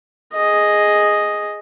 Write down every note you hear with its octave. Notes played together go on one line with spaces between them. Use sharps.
G#4 D#5